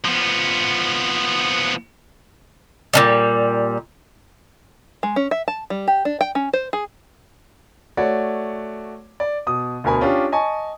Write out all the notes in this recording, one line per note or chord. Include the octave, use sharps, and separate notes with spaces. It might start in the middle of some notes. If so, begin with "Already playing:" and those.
F3 B3
A#2 D#3 G3
G#3
C#4
E5
A5
G3
G4
D4
G5
C#4
C5
G#4
A3 F#4 C#5 D5
D5
B2 D#6
D2 B2 A#4 G#5 B5
C#4 D4 F4 G4
D#5 G#5 A5 C#6